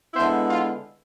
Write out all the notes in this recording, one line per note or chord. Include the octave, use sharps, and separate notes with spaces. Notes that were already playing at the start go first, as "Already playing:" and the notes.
D3 G#3 B3 E4 C5 E5
F4